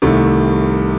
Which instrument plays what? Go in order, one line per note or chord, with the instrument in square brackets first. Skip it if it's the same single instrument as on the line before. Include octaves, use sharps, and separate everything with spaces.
[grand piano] C2 C3 D#3 A3